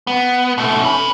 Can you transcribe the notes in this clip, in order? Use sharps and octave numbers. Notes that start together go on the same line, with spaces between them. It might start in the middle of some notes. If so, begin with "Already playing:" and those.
B3
B2 A3
C#4 B4